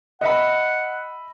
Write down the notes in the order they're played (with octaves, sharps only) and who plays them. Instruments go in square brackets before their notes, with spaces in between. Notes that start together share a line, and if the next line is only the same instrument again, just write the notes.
[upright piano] D#5 E5 B5 [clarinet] F#5